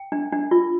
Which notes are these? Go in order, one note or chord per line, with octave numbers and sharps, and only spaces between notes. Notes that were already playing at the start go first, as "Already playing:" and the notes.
Already playing: G5
D4
D4
F4